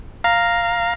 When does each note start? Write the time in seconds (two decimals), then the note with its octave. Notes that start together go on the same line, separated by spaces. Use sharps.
0.24 F5 A#5